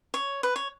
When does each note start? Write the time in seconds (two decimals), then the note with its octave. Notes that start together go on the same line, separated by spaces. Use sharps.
0.14 C#5
0.43 B4
0.56 C#5